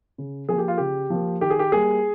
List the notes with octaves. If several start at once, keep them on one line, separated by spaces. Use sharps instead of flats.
C#3
F3 A#3 G#4
G4
F4
C#3 G4
F3 A#3
D#3 G4
G#4
G4
G3 A#3 G#4